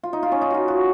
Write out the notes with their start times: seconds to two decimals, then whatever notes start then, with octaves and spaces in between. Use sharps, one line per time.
0.03 F4
0.13 D#4
0.23 F4
0.32 C#4
0.42 D#4
0.50 F4 F#4
0.68 F#4